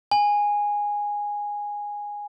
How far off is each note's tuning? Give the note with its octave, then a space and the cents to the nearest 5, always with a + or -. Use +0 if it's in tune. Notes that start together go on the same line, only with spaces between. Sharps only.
G#5 -10